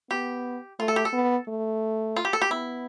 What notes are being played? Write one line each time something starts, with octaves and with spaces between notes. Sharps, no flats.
B3 G4
A3 F4
A4
G4
A4
B3
A3
F4
G4
A4
G4
B3 E4